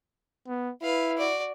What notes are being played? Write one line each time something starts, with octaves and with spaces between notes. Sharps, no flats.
B3
E4 B4 F5
F#4 D5